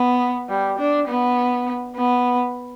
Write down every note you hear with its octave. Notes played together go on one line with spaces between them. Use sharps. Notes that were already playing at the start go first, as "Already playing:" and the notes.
Already playing: B3
G3
D4
B3
B3